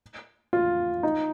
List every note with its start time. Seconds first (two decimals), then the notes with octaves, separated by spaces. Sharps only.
0.53 F4
1.03 D#4